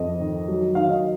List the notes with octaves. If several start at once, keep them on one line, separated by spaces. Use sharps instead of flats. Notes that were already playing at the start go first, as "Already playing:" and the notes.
Already playing: F2 D#5
D#3
F#3
D#3 F5
D#5